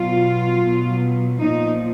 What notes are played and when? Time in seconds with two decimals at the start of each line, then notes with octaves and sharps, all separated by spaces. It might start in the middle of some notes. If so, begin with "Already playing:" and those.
Already playing: B2 F#3 F4
0.62 B2 F#3
1.40 A#2 F3 D#4